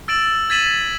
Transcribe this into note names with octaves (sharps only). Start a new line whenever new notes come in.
E6 A6 D7 E7 F#7
G#6 A6 B6 D#7 E7 F#7